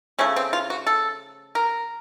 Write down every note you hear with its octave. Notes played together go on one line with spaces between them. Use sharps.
C#3 F3 A3 C#4
C4
F4
F#4
A4
A#4